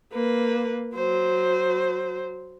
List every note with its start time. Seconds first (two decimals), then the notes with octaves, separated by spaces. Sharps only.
0.12 A#3 B4
0.95 F#3 C5